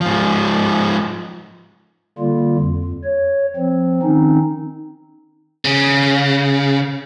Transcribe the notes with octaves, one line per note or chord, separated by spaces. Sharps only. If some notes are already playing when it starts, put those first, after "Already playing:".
G#2 F3
D3 G3 A#3 F4
F2
C#5
F3 C4
D#3 C4 C#4 D#4
C#3